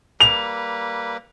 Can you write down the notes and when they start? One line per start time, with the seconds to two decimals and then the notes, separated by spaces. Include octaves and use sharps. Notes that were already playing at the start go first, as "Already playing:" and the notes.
0.20 G3 A#3 B4 F7